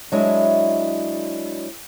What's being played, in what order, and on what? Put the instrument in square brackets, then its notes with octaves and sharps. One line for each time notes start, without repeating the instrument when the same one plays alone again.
[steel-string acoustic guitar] F#3 G#3 D4 E4